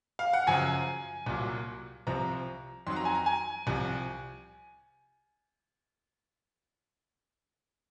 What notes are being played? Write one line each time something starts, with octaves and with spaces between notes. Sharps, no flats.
F5
F#5
F#2 C#3 F3 G#5
C2 A#2 F#3
C2 C3 F3 A#5
F2 D#3 F#3 C6
A#5
G#5
A#5
G#5
C2 C3 F3